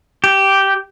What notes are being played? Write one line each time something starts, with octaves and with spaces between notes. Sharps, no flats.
G4